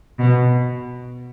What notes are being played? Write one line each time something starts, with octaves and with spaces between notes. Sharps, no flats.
B2